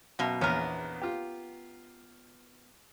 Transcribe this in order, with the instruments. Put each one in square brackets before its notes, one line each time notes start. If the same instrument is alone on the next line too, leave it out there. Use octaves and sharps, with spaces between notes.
[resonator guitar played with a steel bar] F#2 B2 [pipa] A#3
[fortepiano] A#1 E2 [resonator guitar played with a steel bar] B3 [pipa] C#4 A#4
[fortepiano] F4 G4